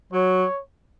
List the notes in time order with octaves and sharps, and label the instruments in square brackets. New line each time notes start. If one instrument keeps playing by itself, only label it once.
[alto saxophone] F#3 [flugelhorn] C#5